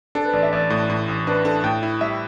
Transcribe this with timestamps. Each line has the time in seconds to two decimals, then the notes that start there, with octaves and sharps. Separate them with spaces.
0.15 D4 A4
0.25 B4
0.33 A1 D5
0.43 E5
0.52 A1 D5
0.70 A2
0.90 A2
1.08 A1
1.27 D4 B4
1.45 D4 A4
1.64 A2 G5
1.83 E4
2.01 G3 E5